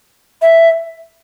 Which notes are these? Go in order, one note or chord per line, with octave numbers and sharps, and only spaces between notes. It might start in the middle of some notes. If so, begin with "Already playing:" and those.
E5